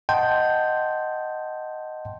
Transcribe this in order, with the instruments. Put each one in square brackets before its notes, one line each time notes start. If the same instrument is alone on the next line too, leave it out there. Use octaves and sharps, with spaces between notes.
[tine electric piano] D#5 F#5 G5 A5 C6 G6